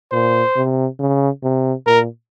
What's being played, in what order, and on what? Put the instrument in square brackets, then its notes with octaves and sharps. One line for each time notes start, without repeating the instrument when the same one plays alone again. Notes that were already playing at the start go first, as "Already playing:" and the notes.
[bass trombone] A#2 [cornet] C5
[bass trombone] C3
C#3
C3
[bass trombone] A#2 [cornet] A#4